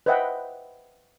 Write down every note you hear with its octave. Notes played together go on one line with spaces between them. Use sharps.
B4 C5 D#5 E5 F#5 G5